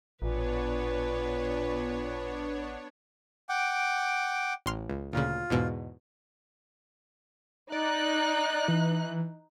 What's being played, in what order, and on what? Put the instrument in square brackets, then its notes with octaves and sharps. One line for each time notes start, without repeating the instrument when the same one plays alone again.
[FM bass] A1 [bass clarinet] A#2 [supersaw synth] B3 D4 C#5 [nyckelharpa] B4
[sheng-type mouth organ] F#5 G5 D6
[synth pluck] A1 C6 F6
C#2
[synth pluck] D2 A#2 C#3 [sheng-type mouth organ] F4
[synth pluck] E2 G#2 B2
[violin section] D#4 F#6 [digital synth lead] D5
[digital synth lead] E3